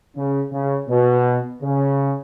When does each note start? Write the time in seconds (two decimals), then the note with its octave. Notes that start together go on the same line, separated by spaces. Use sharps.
0.16 C#3
0.52 C#3
0.89 B2
1.62 C#3